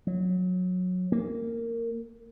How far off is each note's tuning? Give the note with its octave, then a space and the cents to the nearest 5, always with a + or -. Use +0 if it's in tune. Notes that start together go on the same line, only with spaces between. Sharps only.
F#3 -20
A#3 -15